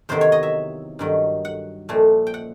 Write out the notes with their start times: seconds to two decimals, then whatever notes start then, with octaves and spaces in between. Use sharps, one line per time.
0.09 E2 C3 D#3 F#3 C5
0.21 C#5
0.32 D#5
0.43 E5
0.99 G2 D#3 F#3
1.45 F#5
1.89 A#2 F3 A3
2.27 G5
2.34 F#5